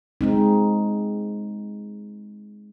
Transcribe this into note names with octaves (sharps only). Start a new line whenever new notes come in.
G#3 C4 D#4